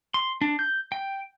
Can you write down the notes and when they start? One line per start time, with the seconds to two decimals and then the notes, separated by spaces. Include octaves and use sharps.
0.14 C6
0.41 D4
0.59 G6
0.92 G5